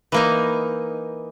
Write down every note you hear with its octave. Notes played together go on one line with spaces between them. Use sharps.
E3 A#3 D#4